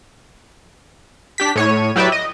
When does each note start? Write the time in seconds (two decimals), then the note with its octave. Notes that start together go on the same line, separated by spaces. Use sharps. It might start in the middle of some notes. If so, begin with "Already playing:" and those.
1.38 D4 G4 B6
1.56 A2 C#5 D#7
1.96 F#3 E4 G4 B4 D5 E5
2.12 D#5